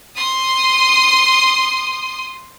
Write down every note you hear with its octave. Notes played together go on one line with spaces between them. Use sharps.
C6 D#6